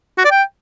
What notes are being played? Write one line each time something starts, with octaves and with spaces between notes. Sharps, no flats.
F#4
D5
G5